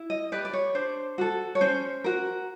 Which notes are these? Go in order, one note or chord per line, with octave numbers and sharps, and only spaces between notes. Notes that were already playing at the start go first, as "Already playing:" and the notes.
Already playing: E4
D#5
G4 B4 D5
D5
C#5
D4 C5
F#4 A4
C#5
C#4 C5
F#4 A#4